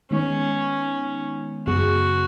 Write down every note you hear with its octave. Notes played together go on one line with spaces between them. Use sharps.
D#3 G#3 B3 C#4 D#4
F#2 C#3 B3 F#4 G#4